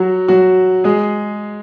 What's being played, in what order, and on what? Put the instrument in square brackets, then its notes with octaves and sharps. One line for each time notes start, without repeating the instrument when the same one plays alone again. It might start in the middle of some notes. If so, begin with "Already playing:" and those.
Already playing: [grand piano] F#3 F#4
F#3 F#4
G#3 G#4